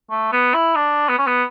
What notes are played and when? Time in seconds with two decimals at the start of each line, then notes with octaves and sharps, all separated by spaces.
0.10 A3
0.32 B3
0.54 E4
0.75 D4
1.09 B3
1.18 C#4
1.27 B3